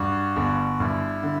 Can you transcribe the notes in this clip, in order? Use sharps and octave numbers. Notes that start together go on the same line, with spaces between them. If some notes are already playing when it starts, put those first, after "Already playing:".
Already playing: G2 F#4
G1
G2 E4
D3